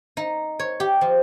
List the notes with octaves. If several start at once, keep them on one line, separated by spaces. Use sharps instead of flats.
D#4
C#5
G4
F3